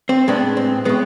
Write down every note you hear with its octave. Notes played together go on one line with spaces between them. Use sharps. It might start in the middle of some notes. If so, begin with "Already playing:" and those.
C4
A2 G#3 B3 D4
C4
A2 G#3 B3